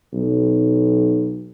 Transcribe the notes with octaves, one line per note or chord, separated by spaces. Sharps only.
B1